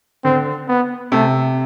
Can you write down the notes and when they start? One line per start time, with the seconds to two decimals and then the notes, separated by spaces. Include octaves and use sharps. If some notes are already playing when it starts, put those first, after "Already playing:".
0.24 D3 C4
0.68 B3
1.12 C3 A3